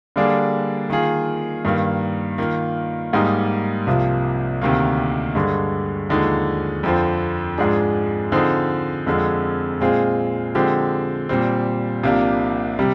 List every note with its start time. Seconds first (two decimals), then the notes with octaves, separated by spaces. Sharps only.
0.16 D3 G3 A#3 D4 G#4
0.90 D#3 A#3 F4 G#4
1.65 G2 D#3 A#3
2.38 D#3 A#3 F4
3.13 G#2 G3 A#3 D#4 G4
3.87 C2 C3 F3 A#3
4.61 D2 C3 D#3 A#3
5.35 G2 D3 G#3
6.09 D#2 D3 F3 G#3 D#4
6.83 F2 D3 F3 C4
7.58 G#2 F3 G#3 D4 G#4
8.32 D3 F3 C4 D#4 G#4
9.07 F2 D3 F3 G#3
9.80 A#2 G#3 C4 F4 G#4
10.55 D3 F3 G#3 C4 G4
11.29 A#2 G3 C4
12.03 C2 C3 F3 A#3 D4
12.79 C3 G3